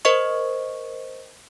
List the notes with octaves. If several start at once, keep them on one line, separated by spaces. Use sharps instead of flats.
A#4 C5 D#5 C#6